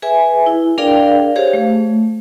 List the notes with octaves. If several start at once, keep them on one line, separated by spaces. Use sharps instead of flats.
G#4 B4 E5 G#5
E4
D4 G#4 A#4 D5 F5 G5
G4 G#4 C5 C#5 F5
A3